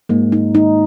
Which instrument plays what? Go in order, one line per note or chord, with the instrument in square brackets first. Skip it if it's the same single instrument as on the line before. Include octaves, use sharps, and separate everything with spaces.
[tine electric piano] G#2 G#3 [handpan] A#3
[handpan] D#4
D#4